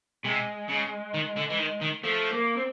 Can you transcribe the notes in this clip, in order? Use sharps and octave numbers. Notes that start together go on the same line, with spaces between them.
C3 G#3
C#3
D#3
D3
E3
D#3
D#3
F3 A3
A#3
C4